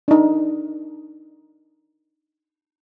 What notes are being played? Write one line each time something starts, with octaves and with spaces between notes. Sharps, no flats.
D4 D#4